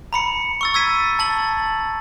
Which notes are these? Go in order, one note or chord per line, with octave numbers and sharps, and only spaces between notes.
A#5 B5 C#7
C#6 E6 A6
E6 G#6 A6 B6 D#7
A5 A6 F#7